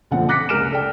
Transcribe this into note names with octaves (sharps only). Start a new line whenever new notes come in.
B1 A#2 D3 F3 C4 F#5
D6 F#6 A#6 B6 C#7
C#2 G#3 A#4 F6 D7 E7
A4 D5 G5